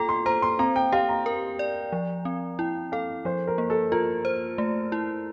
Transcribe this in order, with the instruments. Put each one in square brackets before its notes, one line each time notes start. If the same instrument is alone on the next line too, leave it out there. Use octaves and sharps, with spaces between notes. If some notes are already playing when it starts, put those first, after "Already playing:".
Already playing: [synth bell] F4 A4 [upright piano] G5 A#5
[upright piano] C6
[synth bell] C5 [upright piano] A#5
[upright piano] C6
[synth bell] C4 [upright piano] A#5
[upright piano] G5
[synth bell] G4 [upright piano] F5
[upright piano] A#5
[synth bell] A#4
D5
F3
C4
[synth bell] E4 [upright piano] G5
[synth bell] A4 [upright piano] F5
[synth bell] F3 [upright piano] C5
[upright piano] A#4
[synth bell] A#3
[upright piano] A4
[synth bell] F4 [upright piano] A#4
[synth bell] C5
A3
E4